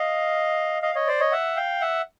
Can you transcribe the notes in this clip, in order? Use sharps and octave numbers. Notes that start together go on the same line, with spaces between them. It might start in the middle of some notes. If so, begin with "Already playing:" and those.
Already playing: D#5 F5
D#5 F5
C#5 D#5
C5 D5
C#5 D#5
E5 F#5
F5 G5
E5 F#5